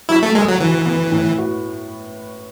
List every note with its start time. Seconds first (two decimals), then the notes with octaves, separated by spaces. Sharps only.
0.09 F#3 E4
0.23 A3
0.35 G#3 A4
0.48 F#3
0.60 E3 F#4
0.86 B3
1.12 A2
1.38 F#4